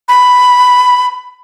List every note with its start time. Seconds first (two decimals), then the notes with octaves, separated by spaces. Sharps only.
0.08 B5